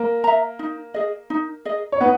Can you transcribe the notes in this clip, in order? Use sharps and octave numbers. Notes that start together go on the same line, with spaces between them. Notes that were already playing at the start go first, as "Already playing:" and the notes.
Already playing: A#3 A#4
E5 A#5
D#4
G#4 D#5
D#4
G#4 D#5
C#5
B3 D#4 B4